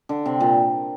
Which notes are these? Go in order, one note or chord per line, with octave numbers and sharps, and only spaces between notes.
D3
C3
A#2